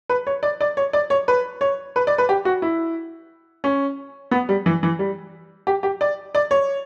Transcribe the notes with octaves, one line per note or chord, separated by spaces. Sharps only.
B4
C#5
D5
D5
C#5
D5
C#5
B4
C#5
B4
D5
B4
G4
F#4
E4
C#4
B3
G3
E3
E3
G3
G4
G4
D5
D5
C#5